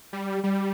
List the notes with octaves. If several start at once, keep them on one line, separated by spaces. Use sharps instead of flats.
G3
G3